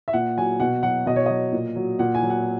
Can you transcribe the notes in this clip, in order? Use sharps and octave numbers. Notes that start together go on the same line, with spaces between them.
E5
A#2 F#5
F#3 G#5
B2 F#5
F#3 F#5
B2 D#5
C#5
F#3 D#5
A#2
F#3
A#2 F#5
G#5
F#3
F#5